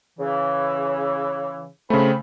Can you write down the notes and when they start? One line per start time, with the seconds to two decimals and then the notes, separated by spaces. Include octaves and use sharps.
0.19 C#3 E3
1.90 C#3 A3 C4 B5